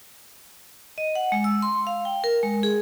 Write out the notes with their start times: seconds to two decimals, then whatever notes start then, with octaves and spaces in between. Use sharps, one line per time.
0.98 D#5
1.15 F#5
1.32 G#3
1.44 E6
1.62 C6
1.87 F5
2.05 G5
2.24 A#4
2.43 G#3
2.63 G#4